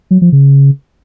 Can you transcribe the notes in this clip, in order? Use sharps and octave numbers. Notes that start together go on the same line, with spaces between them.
F#3
F3
C#3